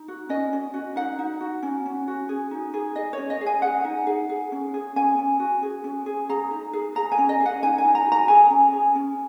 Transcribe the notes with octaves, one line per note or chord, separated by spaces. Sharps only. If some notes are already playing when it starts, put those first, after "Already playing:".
Already playing: D#4
F#4
C#4 D#5
C#4
F#4
D#4 F#5
D#4
F#4
C#4
C#4
F#4
G#4
D#4
G#4
G#4 D#5
C#5
C#4
D#5
G#4
G#5
G#4 F#5
D#4
G#4
G#4
C#4
G#4
C#4 G#5
C#4
F#4
G#4
C#4
G#4
G#4 A#5
D#4
G#4
G#4 A#5
G#5
C#4
D#5
G#4
F#5
D#4 G#5
G#5
D#4
A#5
F#4
A#5
G#4 G#5
C#4
G#4
C#4